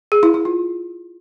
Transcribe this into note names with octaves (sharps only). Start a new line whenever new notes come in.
G#4
E4
E4
F4